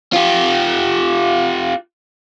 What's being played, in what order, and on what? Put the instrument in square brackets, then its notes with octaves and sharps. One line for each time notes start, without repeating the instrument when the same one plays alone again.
[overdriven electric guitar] F4 G4